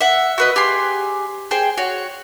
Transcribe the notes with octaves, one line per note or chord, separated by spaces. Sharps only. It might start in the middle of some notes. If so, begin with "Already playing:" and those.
E5 F#5
F#4 B4 D#5
G4 G#4 C6
G#4 C5 G5
F#4 C#5